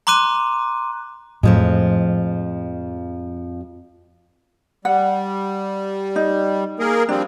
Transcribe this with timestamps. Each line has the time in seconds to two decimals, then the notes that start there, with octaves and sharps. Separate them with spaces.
0.07 A#5 C6 D6 F#6 D#7
1.43 F2 A2 F3 G#3
4.85 G3 F#5
6.16 D#4
6.79 A#3 G#4 A#4
7.09 F3 G3 C4 D4